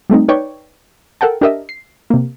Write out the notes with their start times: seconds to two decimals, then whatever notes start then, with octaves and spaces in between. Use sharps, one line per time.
0.10 G3 A3 C4 D#4
0.28 D#4 B4 C#5 D5 G5 C#6
1.21 A4 A#4 F#5 G5 A5
1.41 D4 G4 A#4 D#5 E5
1.69 C7
2.10 C3 A#3